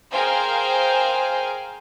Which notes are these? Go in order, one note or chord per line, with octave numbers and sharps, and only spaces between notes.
G#4 A#4 C5 F5 G5 G#5